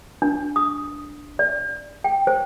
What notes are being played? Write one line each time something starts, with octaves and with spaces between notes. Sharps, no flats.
D4
D#6
D5
G5
C5